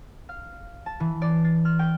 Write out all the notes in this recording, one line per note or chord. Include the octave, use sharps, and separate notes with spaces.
F5
A5
E3
D5
A6
F6
G5